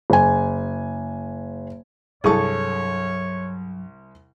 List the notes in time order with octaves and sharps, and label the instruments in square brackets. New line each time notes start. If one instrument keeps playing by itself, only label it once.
[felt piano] F#1 G#5
[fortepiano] C2 C#6 [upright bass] G2 F#3 [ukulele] G#4 A4 [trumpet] C#5